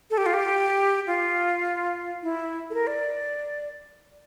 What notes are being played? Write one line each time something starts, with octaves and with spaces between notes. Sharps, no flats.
A4
G4
F4
G4
F4
E4
A4
A#4
D5